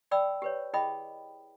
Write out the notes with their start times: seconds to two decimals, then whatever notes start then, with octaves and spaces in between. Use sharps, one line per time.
0.11 D5 G5 B5 D#6 E6
0.42 G4 B4 C#5
0.73 E4 G#4 D#5 G5 B5 D#6